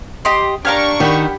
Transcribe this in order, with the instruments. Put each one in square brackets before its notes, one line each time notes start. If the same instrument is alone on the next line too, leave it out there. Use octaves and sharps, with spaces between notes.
[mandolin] G4 D#5 C6
[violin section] D4 C#6 [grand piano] G4 G#6 [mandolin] A#4 F5 F6
[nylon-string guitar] D#3 [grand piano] G4 F#5 B5